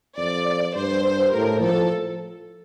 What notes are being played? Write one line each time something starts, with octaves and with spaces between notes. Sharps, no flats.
F2 D5
G2 C5
A2 A#4
F3 A4